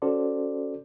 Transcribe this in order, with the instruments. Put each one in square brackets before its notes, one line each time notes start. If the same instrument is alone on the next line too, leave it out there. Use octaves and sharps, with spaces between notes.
[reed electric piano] C#4 F#4 A4 C5 D5